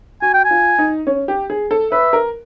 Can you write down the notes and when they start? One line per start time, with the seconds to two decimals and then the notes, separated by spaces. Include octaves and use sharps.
0.22 F#4 G#5
0.34 G5
0.45 G#5
0.51 F4
0.79 D#4
1.07 C#4
1.28 G4
1.50 G#4
1.71 A4
1.92 B4 E5
2.13 A#4